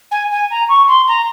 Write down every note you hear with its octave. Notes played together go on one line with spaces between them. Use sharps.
G#5
G#5
A#5
C#6
C6
A#5